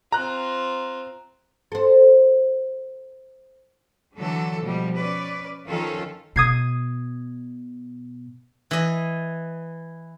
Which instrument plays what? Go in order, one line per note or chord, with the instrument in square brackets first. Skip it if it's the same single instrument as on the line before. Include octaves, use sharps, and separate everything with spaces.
[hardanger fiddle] C4 F4 [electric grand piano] A#5 F#6
[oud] A4 C5
[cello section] D3 E3 F#3 A4
B2 F3 G3
C#4 B4 D5
D#3 F3 C#4 F4 A4
[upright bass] B2 [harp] D#6 G#6 C7
[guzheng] E3 D#5